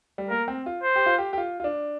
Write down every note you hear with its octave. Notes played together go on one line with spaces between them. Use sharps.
G3
A#3 A#4
C4
F4
C5
G4
F4
G4
G4
F4
F4
D4